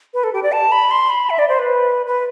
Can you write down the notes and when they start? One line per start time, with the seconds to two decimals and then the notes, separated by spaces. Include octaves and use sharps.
0.14 B4
0.24 A4
0.33 G4
0.43 D5
0.52 A5
0.72 B5
0.91 C6
1.10 B5
1.30 E5
1.39 D5
1.49 C5
1.59 B4
2.06 B4